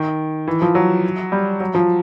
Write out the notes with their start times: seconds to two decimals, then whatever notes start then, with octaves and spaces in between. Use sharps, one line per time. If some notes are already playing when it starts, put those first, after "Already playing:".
Already playing: D#3
0.48 E3
0.62 F3
0.75 F#3
1.32 G3
1.60 F#3
1.75 F3